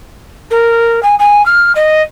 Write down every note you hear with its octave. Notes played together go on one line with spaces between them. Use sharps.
A#4
G#5
G#5
F6
D#5